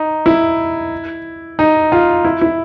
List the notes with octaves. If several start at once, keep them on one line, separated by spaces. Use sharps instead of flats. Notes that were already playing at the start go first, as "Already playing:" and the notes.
Already playing: D#4
E4
D#4
F4
E4
E4